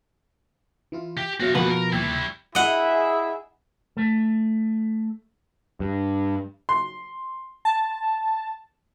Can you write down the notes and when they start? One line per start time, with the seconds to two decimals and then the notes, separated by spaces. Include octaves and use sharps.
0.92 E3 E4 F4
1.17 G4
1.40 B2 F#3 F#4 E5 F5
1.55 B2 F3 G3 A#3 F#4 A#4 B4 F#5
1.70 F#4 A#4 C#6
1.93 D#2 G3 E4 G5 G#6
2.55 E4 G#4 D#5 E5 F#5
3.97 A3
5.80 G2
6.69 C6
7.65 A5